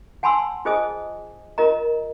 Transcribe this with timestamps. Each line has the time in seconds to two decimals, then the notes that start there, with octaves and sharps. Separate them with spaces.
0.23 F#5 G#5 A5 B5 C6 E6
0.65 F4 G#4 C5 D#5 G#5 D#6
1.58 F4 A#4 D#5 A#5